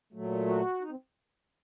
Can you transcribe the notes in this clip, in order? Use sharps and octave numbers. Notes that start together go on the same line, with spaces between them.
A#2 F#3 A3
F#4
D#4
C4